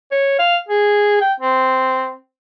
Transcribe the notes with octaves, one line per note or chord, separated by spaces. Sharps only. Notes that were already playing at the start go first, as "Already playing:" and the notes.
C#5
F5
G#4
G5
C4